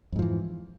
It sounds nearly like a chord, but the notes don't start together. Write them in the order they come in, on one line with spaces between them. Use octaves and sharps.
F2 G#2 F3 E3